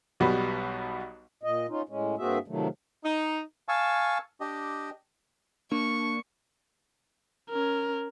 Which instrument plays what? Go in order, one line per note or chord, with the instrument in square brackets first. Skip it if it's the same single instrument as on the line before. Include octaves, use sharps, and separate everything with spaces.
[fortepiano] B1 B2 G3 B3
[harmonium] A#2 D#5
C#4 D#4 F4
A2 G#3 C#4
G2 A#3 C4 F#4 G#4 E5
C3 D#3 F3 F#3 A3
[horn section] D#4
[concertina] F5 G#5 A5 C#6 E6
D4 G4 D#5
[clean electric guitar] A#3 [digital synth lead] D4 [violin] C#6
[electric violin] C#4 A#4